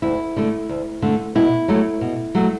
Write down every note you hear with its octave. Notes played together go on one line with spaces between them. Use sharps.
D2 E4
D3 A3
D2
D3 A3
B2 E4
F#3 A3
B2
F#3 A3